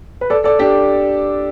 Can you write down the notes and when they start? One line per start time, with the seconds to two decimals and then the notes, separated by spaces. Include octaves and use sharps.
0.21 B4
0.30 A4 D5
0.44 A4 D5
0.59 D4 G4